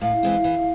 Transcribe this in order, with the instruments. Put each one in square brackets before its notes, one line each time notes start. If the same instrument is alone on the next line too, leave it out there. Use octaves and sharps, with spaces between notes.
[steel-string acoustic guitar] A2 [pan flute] F5
[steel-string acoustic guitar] E3 G#3 C4
E3